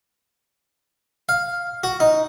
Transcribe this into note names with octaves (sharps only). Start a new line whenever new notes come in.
F5
F#4
D#4